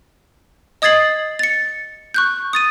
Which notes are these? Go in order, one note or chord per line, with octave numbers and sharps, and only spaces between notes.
D#5 D#6 G#6 A6 C7 F#7
A6 C#7
C#6 F#6 G6
D#6 A6 D#7